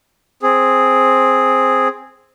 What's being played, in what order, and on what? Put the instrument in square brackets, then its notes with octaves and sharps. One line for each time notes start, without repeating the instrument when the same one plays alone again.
[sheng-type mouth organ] C4 G#4